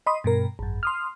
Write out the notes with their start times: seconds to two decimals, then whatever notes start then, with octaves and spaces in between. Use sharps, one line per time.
0.06 D#5 B5 C6 D#6
0.24 G2 B2 A#4
0.59 G#1 F#2
0.83 C6 D#6 F6